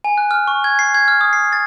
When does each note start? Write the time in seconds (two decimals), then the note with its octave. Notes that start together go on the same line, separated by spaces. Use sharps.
0.04 G#5
0.18 F#6
0.31 F6
0.47 C#6
0.64 G#6
0.79 C7
0.94 G#6
1.08 F6
1.21 D#6
1.33 C7
1.53 A6